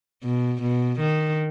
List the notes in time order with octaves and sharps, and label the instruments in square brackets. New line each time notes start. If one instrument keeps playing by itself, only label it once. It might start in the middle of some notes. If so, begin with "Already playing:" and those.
[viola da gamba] B2
B2
D#3